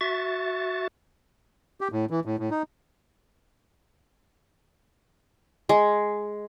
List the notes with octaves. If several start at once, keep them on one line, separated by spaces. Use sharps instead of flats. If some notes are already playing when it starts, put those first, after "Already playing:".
F#4 E5 C#6 A6
G4
A2
E3
A2
A2
D#4
G#3